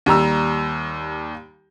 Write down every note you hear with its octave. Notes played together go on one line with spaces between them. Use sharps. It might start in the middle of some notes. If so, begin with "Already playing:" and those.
D#2 G3 A#5 E6